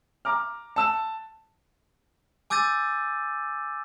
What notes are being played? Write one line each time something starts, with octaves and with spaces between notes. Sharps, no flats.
A#5 D6 F6
A5 E6 E7
G#5 D6 E6 G6 A6 D#7